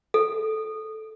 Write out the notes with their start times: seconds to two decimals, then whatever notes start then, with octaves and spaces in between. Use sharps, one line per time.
0.14 A4